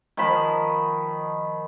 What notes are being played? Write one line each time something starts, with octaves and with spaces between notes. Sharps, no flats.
D#3 F3 A5 B5